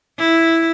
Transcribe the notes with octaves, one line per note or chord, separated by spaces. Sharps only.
E4